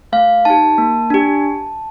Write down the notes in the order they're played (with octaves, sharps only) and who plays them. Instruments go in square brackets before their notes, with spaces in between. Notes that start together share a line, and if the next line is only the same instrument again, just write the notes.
[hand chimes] A3 F5
D#4 G4 A5
A#3
D4 G4